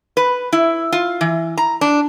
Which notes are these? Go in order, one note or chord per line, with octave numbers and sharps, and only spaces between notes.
B4
E4
F4
E3
A#5
D4